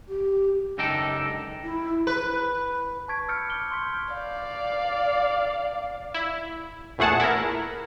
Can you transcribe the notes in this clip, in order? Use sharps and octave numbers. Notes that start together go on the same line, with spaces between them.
G4
C#2 F#2 D3 D#4 A4 G5
E4
B4
A5 B5 C#6 G#6 B6 D7
E6 F6 G6 A6 C#7 D7
D6 F6 G7
C6 C#6 G6 B6
D5 F5
E4
A#1 E2 A3 G#4 F#5 A5
E4 A#4